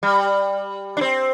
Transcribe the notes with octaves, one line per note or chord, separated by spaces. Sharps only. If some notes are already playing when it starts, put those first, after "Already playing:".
G3
D4
C4